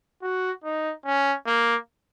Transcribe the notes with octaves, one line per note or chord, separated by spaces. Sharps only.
F#4
D#4
C#4
A#3